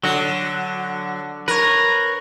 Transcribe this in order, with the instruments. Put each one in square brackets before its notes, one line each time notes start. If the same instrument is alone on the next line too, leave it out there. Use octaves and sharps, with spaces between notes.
[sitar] D3 [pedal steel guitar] F#3 F#4
[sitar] A#4 [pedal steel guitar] B4 C#5